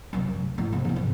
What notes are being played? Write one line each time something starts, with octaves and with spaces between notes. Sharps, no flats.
F#2 C3
D2
G#1 A2
C3
E2 C4
G#2 C3